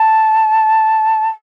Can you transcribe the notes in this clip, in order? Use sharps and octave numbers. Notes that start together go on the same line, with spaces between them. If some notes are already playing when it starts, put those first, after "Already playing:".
Already playing: A5